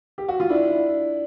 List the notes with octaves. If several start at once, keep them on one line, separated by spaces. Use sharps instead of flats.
G4
F#4
F4
D4 E4